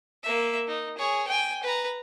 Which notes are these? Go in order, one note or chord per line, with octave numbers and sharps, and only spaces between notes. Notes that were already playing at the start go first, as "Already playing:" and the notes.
A#3 E5
D#4
G#4 C#5
G5 G#5
B4 A#5